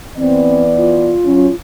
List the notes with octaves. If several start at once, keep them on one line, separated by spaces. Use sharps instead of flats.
E3 B3 C4 D5
F4
F#3 C#4